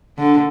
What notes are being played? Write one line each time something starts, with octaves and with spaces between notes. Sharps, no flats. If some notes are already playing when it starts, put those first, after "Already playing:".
D3